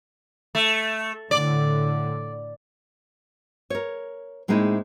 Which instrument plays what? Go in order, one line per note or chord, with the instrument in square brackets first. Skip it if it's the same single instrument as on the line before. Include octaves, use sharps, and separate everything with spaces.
[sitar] A3
[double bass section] A2 D3 [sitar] D5
[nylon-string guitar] A#4 C#5
A2 G#3 A#3 C4 D#4 E4